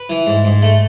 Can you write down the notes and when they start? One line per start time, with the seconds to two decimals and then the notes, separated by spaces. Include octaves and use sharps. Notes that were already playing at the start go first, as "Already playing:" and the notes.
Already playing: B4
0.09 E3
0.27 G#2
0.45 G#2
0.62 A3